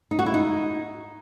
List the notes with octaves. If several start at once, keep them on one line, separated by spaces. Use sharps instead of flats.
D#4
F#4
E4
D#4